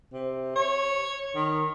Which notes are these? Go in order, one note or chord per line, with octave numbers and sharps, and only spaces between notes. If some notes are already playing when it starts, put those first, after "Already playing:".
C3
C#5
D#3